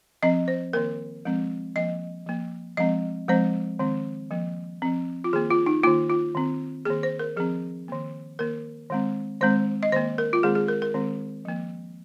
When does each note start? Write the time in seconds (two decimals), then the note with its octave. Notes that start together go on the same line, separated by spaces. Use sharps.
0.23 F3 C4 D#5
0.48 C5
0.73 D#3 A#3 A#4
1.25 F3 G#3 C4
1.76 F3 A#3 D#5
2.27 F3 A#3
2.77 F3 G#3 C4 D#5
3.28 F3 G#3 C4 C5
3.79 D#3 G#3 C4
4.31 F3 A#3
4.82 F3 C4
5.24 F4
5.33 D#3 A#3 G#4
5.51 F4
5.66 D#4
5.84 D#3 A#3 F4
6.10 F4
6.35 D#3 C4
6.85 D#3 A#3 G#4
7.03 C5
7.19 A#4
7.36 F3 C4 G#4
7.88 D#3 A#3
8.39 D#3 A#3 A#4
8.90 D#3 G#3 C4
9.41 D#3 G#3 C4 C5
9.83 D#5
9.92 D#3 A#3 C5
10.18 A#4
10.33 F4
10.43 D#3 G#3 C4 G#4
10.55 G#4
10.68 A#4
10.82 A#4
10.94 D#3 G#3 C4
11.45 F3 A#3